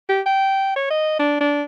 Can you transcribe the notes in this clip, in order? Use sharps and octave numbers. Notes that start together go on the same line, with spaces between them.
G4
G5
C#5
D#5
D4
D4